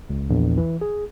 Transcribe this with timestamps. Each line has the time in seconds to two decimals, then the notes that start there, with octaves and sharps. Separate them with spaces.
0.10 C#2
0.30 A#1 E2
0.57 E3
0.81 G#4